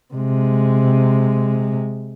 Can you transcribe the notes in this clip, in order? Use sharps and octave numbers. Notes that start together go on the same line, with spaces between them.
C3 G#3